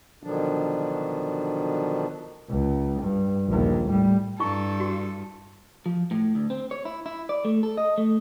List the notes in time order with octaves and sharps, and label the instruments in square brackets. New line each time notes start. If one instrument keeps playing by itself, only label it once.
[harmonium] B2 D3 D#3 F3 F#3 D4
[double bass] C#2
G2
A#1 D#2
A2 G3
[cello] G2 [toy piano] E4 C#6 [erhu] A4
[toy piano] F#4
[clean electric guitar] F3
A2
D2
C4
C#5
E4
E4
D5
A3
A4
D#5
A3